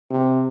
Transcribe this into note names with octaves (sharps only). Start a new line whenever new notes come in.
C3